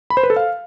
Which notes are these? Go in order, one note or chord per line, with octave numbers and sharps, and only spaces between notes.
B5
C5
B4
A4
F5